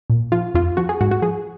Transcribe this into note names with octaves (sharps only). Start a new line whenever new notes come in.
A#2
F3 F4
F2 F4
F3 F#4
G#4
G#2 F#4
F#4
F3 G#4